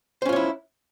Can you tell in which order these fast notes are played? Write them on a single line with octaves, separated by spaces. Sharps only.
C5 C#4 F4 C#5 E4